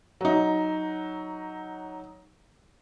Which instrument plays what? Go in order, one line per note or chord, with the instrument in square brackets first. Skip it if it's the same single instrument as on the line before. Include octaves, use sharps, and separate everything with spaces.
[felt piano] F#3 D#4